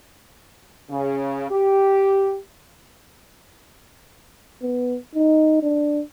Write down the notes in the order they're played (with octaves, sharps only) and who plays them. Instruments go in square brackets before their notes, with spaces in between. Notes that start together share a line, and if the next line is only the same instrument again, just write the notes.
[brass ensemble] C#3
G4
[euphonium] B3
D#4
D4